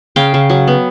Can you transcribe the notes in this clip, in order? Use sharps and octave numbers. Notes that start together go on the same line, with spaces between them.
C#3 F5 G5
C#3
F#3
B3